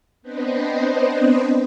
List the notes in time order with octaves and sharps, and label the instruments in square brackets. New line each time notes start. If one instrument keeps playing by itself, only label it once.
[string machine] B3 C4 D4 B4 C5 D#5